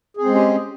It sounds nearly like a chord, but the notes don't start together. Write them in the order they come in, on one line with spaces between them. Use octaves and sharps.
G#4 C4 G#3 C#4 G4